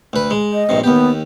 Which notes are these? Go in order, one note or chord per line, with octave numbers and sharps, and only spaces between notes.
D2 B4
G#3
D#5
A#1 G2 C3
D#2 B3 G4